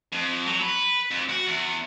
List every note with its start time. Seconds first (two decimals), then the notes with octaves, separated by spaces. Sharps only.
0.13 F2
0.46 F#3
0.61 B4
1.11 F2
1.29 F#4
1.46 E2